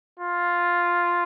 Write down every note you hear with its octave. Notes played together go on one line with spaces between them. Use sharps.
F4